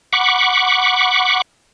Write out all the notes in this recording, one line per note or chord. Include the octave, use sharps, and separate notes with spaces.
F#5 B5 C#6 D6